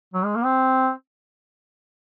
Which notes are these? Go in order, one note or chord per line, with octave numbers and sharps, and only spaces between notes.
F#3
G#3
A#3
C4